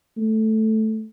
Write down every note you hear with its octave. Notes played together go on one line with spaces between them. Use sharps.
A3